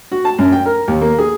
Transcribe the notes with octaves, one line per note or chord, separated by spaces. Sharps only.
F#4
A5
F#2
G5
A#4
D#2
A#3
G#4